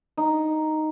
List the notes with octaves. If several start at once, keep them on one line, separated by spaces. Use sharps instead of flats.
D#4